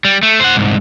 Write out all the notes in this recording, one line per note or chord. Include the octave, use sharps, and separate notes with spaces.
G3
A3
C5 F#5
C2 G#2